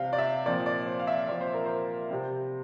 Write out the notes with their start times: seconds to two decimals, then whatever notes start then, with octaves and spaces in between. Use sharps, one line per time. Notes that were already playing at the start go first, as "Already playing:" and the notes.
Already playing: C3 G3 C4 F5 G5
0.13 D5
0.18 E5
0.46 A#2 F3 C4 D5
0.66 D5
0.86 C5
0.99 F5
1.07 E5
1.28 A#2 F3 C4 D5
1.41 C5
1.54 A#4
1.66 C5
2.10 C3 G3 C4